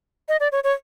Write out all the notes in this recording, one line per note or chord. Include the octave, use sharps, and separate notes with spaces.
D#5
D5
C#5
C#5